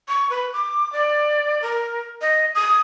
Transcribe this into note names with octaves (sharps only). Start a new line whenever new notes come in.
C#6
B4
D6
D5
A#4
D#5
D#6